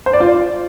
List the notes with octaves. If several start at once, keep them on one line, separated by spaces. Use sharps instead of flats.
C5
D5
F4